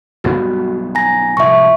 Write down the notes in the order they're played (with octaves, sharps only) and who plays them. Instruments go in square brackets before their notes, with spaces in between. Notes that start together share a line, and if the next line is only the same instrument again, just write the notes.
[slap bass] B1 G2 B3 [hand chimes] F#4
[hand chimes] G#5 A#5 A#6
[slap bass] C2 A2 F3 [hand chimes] E5 C#6